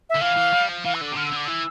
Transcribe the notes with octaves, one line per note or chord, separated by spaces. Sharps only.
E5
D3
E3 F5
E3
G3
F3
E3 F5
E6
D3
D6
C3
D3 F6
E6
D3 D6
E3 E6